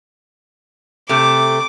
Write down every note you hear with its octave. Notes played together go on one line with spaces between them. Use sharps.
C3 A3 D6